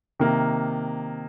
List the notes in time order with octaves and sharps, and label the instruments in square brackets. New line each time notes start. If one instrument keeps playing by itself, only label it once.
[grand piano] C3 D#3 A#3